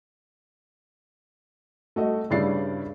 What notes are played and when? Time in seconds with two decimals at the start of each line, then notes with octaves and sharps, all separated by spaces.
1.96 A3 F#4 D#5
2.30 G2 C#3 E4 D5 A6 C7